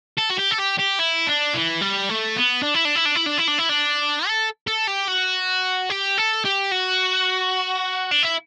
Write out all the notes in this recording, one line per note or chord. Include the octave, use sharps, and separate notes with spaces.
A4
F#4
G4
A4
G4
G4
E4
D4
E3
G3
A3
B3
D4
E4
D4
E4
D4
E4
D4
E4
D4
E4
D4
A4
A4
G4
F#4
G4
A4
G4
F#4
D4
E4